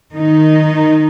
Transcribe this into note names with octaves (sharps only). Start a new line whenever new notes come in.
D#3 D#4